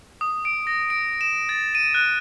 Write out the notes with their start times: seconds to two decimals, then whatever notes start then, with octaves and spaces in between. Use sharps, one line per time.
0.21 D#6
0.45 D7
0.67 A#6
0.90 D7
1.21 E7
1.49 A6
1.75 D#7
1.94 F#6